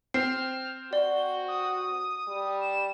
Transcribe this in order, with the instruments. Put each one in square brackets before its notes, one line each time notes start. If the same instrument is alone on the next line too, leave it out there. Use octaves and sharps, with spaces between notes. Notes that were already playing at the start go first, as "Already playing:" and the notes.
[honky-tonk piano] C4 [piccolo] F6 [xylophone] C7
[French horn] F#4 [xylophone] D5 [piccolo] G7
[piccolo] D#6
[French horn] G3
[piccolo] E7